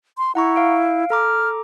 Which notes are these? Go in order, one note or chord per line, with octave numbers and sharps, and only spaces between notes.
C6
E4 F#5 A#5 C#6
F5 D7
A4 A#5 D6 F6